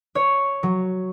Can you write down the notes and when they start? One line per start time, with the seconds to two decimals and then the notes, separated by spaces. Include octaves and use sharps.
0.15 C#5
0.63 F#3